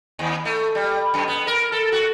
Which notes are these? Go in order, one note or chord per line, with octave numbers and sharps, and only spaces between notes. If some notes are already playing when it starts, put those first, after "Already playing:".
D#2
A3
G3
F#2
B3
A#4
A4
F#4